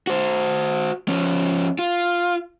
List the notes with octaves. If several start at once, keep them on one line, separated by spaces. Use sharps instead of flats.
F#4 C5
F3 C#4
F4